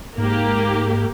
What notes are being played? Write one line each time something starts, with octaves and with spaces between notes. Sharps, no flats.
G#2 A#3 G4